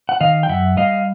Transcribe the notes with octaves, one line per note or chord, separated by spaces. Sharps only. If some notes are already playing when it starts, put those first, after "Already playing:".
F#5
D#3 D#5 F5
G5
F#2 E5 F#5
G3 D#5 F5